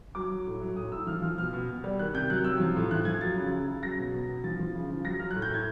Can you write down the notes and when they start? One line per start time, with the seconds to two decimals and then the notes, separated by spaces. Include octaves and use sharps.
0.15 F#3 D6
0.31 F#3
0.47 A2
0.61 F#3
0.76 A2 D#6
0.92 A2 E6
1.07 F3 F6
1.22 F3 F6
1.38 B2 F6
1.53 B2
1.69 B2
1.84 G3
1.99 D#3 F#6
2.14 C3 G6
2.30 F#3 F#6
2.44 C3 E6
2.60 F3
2.76 A2
2.91 F3 F#6
3.05 F3 G#6
3.21 F#3 A6
3.36 C#3
3.52 C#3
3.67 C#3
3.83 F#3 A#6
3.98 B2
4.13 B2
4.29 B2
4.44 F3 A6
4.59 F3
4.74 C#3
4.90 F3
5.05 F#3 A#6
5.19 F#3 F6
5.31 A2 F#6
5.42 G6
5.51 A2 G#6